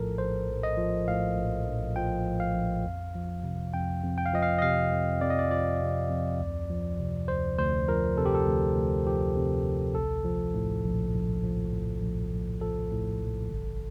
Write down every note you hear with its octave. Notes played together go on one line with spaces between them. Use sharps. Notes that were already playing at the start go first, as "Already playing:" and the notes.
Already playing: A#1 A2 F3 A4 A#4
A#1 C5
A#1
D#5
F3
A2 F5
A#1
A#1
F3 G5
A2
F5
A#1
F2
F3
C3
F2 G5
F2
G5
F5
F3 D#5
F5
D#5
C3 F5
F2
F2 D5
D#5
D5
F3 D5
C3
F2
D2
F3
C3
D2 C5
D2 C5
F3 A#4
C3 A4
G4
A4
D2
D2
F3 G4
C3
D2
A#1 A4
F3
A2
A#1
A#1
F3
A2
A#1
A#1
F3 A4
A2
A#1
G1